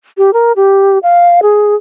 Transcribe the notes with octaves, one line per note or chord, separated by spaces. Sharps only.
G4
A#4
G4
F5
G#4